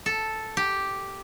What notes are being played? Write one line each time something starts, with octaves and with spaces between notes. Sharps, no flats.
A4
G4